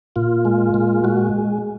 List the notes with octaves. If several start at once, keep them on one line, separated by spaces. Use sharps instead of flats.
A#2 F4
G#3
A#2
G#3 F#4